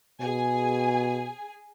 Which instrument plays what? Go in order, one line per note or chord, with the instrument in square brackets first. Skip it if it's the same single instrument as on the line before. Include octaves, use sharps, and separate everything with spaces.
[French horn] B2 [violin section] G#4 G#5